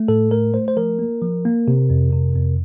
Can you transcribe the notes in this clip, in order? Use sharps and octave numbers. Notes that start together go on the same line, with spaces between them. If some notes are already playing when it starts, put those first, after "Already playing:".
Already playing: A3
A2 A4
A3 A#4
A3 C5
C5
F3 A#4
A#3
F3
A#3
C3
F2
C3
F2